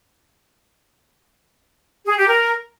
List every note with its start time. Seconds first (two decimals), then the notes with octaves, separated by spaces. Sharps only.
2.06 G#4
2.16 G4
2.27 A#4